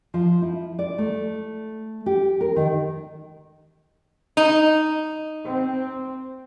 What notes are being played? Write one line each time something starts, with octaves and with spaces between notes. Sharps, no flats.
F3
E4
D5
A3
G4
A#4
D#3
D#4
C4